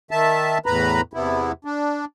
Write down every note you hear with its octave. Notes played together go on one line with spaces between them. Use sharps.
D#3 E5 A5
E2 A2 B4 A#5 B5
E2 C3 B3 E4
D4